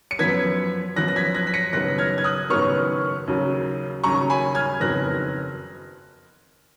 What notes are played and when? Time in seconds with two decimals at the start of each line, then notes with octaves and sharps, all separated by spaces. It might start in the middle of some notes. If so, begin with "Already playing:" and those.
0.11 C#7
0.19 F#2 F3 B3 G#6 B6
0.96 F#2 F3 B3 F#6 A#6
1.08 A#6
1.16 G#6 B6
1.34 F#6 A#6
1.47 B6
1.54 A#6 C#7
1.73 F#1 F#2 D#3 F#3 B3 F#6 A#6
1.98 F6 G#6
2.18 G#6
2.24 D#6 F#6
2.50 F#1 F#2 D#3 F#3 B3 C#6 F6
3.27 D#2 C#3 F#3
4.03 D#2 C#3 F#3 A#5 C#6
4.30 G#5 B5
4.55 F6 G#6
4.80 F#1 F2 D#3 F#3 B3 F#6 A#6